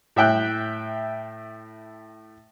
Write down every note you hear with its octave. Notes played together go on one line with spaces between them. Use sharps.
A2 E5 G5 F#6